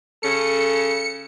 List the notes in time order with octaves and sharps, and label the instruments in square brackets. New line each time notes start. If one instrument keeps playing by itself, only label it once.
[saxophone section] C#3 C#4 A4 [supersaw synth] C#7